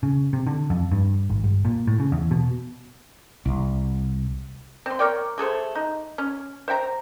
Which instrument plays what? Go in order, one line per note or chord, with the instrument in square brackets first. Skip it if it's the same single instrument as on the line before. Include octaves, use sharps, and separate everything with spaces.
[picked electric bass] C#3
C3
D3
F2
G2
G#1
G1
A#2
A2
C#3
E2
B2
[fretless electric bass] C2
[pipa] C4 C6
A#4 C#5 D5 G5
A3 G#4 A4 C5
D#4
C#4
C5 E5 G5 A#5